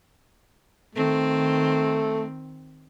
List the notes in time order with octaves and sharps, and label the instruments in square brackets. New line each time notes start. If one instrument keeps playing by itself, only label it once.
[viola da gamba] D#3 C4 [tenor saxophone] A3